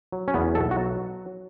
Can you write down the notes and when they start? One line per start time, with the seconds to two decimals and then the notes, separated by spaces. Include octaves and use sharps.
0.12 F#3
0.28 C#4
0.34 E2 B3
0.55 B1 A4
0.71 F#4
0.77 F#3